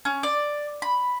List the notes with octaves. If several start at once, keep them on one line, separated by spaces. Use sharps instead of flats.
C#4
D5
B5